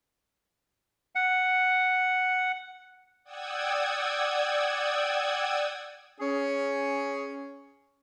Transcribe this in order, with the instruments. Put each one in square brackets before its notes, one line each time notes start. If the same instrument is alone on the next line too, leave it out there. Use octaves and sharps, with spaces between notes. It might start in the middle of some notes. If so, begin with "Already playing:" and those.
[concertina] F#5
[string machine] D5 F#5 G5 D#6 E6 G#6
[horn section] C#4 G#4